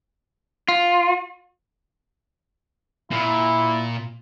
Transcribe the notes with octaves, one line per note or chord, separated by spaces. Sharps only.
F4
A#2 E4